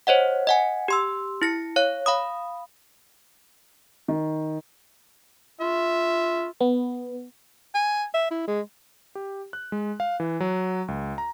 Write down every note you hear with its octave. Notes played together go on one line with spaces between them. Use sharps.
C5 C#5 D#5 F#5
D#5 F#5 G#5
G4 C6 E6
E4 A#6 C#7
C#5 F5 F#6
F5 B5 D#6
D#3
F4 E5
B3
G#5
E5
E4
G#3
G4
F#6
G#3
F5
E3
F#3
C#2
A#5